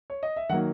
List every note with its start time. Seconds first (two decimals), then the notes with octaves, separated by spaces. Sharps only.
0.10 C#5
0.23 D#5
0.36 E5
0.49 D#3 F#5
0.53 F#3 A#3